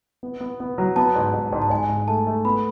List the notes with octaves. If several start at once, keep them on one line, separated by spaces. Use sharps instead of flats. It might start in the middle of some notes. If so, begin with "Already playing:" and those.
B3
B3
B3
F#3
B3 A5
G#2
G#2
G#2
A5
G#2 G#5
G#2
A3 A5
A3
B3 B5